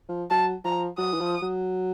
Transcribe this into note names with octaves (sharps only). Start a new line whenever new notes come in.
F3
F#3 A5
F3 A#5
F#3 D#6
E3
F3
F#3